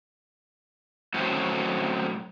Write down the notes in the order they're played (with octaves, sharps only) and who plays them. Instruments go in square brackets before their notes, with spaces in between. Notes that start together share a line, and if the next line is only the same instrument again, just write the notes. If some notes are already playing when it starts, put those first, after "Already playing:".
[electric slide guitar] A2 F#3 C4 C#4 F#4